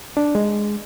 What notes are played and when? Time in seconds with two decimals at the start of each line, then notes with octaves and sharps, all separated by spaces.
0.17 D4
0.35 G#3